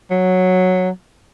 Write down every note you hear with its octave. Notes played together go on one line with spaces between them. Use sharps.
F#3